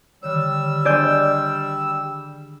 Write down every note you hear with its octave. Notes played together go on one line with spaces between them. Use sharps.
D3 D#3 G3 C#5 E6
D4 G#4 D5 D#5 C6 G6